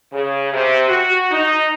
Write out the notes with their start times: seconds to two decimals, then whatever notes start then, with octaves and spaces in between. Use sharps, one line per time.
0.12 C#3
0.53 C3
0.88 F#4
1.31 D#4